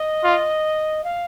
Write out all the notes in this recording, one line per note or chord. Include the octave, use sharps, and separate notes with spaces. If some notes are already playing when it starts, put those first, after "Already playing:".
Already playing: D#5
F4
F5